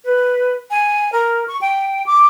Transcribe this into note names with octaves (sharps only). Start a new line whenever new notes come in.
B4
G#5
A#4
C#6
G5
D6